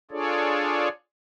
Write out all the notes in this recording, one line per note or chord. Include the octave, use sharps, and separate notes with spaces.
D4 F4 G#4 A4 C#5 D5